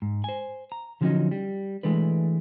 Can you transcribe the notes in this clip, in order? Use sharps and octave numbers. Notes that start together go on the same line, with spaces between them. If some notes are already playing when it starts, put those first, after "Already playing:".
G#2
C5 G#5
A#5
D3 F3 F#3 A#3 C#4 D#4
G3
E3 G#3 A3 D4 B4